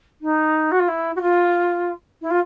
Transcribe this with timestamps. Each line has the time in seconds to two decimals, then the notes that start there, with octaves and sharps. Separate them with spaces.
0.21 D#4
0.71 F#4
0.79 F4
0.87 E4
1.15 F#4
1.21 F4
2.21 E4
2.30 F4